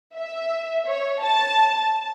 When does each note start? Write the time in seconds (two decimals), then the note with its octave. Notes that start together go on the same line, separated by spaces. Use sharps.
0.14 E5
0.87 C#5
1.21 A5